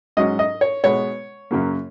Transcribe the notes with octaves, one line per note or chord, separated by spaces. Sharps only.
G#2 F#3 C#4 D#5
D#5
C#5
B2 G#3 B3 C#5
F#2 C#3 F#3 A#3